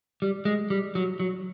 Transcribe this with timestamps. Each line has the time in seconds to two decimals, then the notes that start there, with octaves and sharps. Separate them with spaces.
0.22 G3
0.45 G#3
0.70 G3
0.95 F#3
1.20 F#3